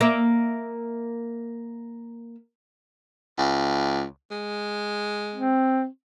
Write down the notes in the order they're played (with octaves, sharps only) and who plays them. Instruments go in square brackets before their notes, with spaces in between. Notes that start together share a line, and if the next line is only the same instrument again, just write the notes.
[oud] A#3 E5
[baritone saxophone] C#2
G#3
[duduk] C4